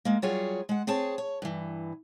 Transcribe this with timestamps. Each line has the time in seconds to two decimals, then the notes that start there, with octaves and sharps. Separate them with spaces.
0.05 G#3 A#3
0.22 F#3 G3 F4 F#4 G#4 C#5
0.69 G#3 F#5
0.87 C4 G#4 C#5 A5
1.18 C#5
1.42 G2 E3